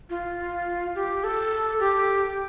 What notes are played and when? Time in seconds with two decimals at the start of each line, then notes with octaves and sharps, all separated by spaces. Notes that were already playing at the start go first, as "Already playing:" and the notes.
0.10 F4
0.95 G4
1.24 A4
1.80 G4